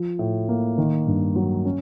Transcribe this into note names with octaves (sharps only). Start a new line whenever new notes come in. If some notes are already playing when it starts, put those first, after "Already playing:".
Already playing: F3
A2
A#3
D#3
G2
F#3
C#4